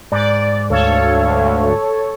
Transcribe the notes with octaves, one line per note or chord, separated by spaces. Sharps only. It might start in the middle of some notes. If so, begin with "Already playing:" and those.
G#2 D5
D2 A4 C#5 F5